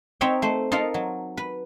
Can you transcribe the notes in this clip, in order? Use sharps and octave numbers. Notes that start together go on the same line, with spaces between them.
C4 D#4 C#5 E5 G5
A3 C5
D#4 F4 A4 A#4 F5
F#3
B4